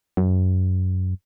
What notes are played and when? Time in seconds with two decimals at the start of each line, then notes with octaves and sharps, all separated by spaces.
0.17 F#2